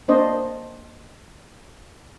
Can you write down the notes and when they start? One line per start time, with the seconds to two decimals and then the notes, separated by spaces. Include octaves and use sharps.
0.08 A#3 C4 D4 C5 D#5